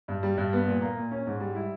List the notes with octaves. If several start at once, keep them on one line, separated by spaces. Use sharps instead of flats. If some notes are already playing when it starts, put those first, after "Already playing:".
G2
G3
G2
B3
A#2
A#3
A#2
C#4
G#2
G3
E4